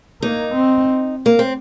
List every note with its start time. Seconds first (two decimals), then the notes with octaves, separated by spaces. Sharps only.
0.22 A#3 D#4
0.55 C4
1.26 A#3
1.39 C4